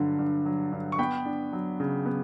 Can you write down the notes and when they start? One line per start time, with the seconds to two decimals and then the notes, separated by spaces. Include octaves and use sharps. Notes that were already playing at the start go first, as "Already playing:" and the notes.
Already playing: G2 D3 F#3
0.19 G2
0.46 F#3
0.72 G2
0.92 C#6
0.99 B3 G5 B5
1.25 D4
1.53 F#3
1.80 C#3
2.06 B3